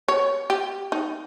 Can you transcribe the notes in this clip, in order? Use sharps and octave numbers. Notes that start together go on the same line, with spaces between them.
C#5
G4
D#4